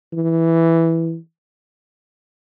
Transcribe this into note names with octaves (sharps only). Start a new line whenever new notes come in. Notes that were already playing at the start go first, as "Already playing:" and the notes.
E3